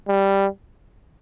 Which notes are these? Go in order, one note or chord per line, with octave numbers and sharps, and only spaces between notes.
G3